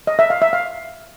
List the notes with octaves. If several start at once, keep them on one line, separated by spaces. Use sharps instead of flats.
D#5
E5
F5
E5
F5